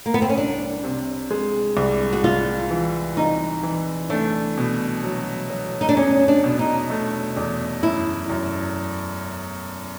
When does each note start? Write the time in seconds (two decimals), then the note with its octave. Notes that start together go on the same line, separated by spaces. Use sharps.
0.06 A#3
0.14 B3
0.22 C4
0.29 C#4
0.37 C2 D4
0.84 C3
1.31 G#3
1.77 C2
2.13 F#4
2.24 C2 F4
2.70 E3
3.17 C2 D#4
3.63 E3
4.10 A3 D4
4.58 B2
5.04 F#3
5.50 F#3
5.81 D#4
5.89 D4
5.97 E2 C#4
6.28 D4
6.44 B2
6.59 D#4
6.90 A3
7.37 E2
7.83 F#2 E4
8.30 F#2